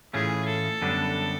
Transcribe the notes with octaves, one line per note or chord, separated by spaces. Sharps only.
A2 E3 A3 C#4 F4 G#4
A4
F#2 D3 G3 B3 D4